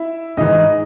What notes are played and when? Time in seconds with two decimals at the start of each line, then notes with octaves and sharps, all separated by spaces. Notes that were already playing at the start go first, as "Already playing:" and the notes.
Already playing: E4 E5
0.37 G#2 E3 D#4 D#5